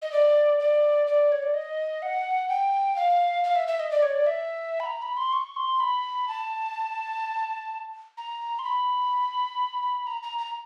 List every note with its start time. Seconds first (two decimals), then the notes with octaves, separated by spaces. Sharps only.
0.02 D#5
0.12 D5
0.60 D5
1.07 D5
1.32 C#5
1.42 D5
1.54 D#5
2.02 F#5
2.49 G5
2.96 F5
3.44 F5
3.55 E5
3.67 E5
3.80 D#5
3.91 D5
4.02 C#5
4.15 D5
4.26 E5
4.80 B5
4.86 A#5
5.02 B5
5.17 C6
5.33 C#6
5.56 C6
5.80 B5
6.28 A5
8.17 A#5
8.59 C6
8.64 B5
10.07 A#5
10.22 A#5
10.38 A#5